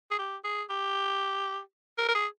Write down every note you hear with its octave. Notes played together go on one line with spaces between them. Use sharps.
G#4
G4
G#4
G4
A#4
A#4
G#4